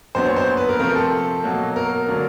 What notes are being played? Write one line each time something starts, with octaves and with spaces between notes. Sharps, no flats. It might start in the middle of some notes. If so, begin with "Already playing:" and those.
A#2 F#3 B3 D4 C5
C#5
C5
B4
A#4
C3 F3 A3 C4 A#4
A4
B2 F#3 A#3
A#4
D3 F#3 A#3 D4